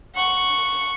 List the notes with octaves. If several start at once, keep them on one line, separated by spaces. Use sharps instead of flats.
F#5 C#6